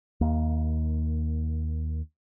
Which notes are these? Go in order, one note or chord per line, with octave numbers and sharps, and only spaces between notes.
D#2 A#3